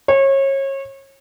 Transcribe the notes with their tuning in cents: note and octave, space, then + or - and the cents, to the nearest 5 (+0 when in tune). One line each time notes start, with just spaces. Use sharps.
C#5 -30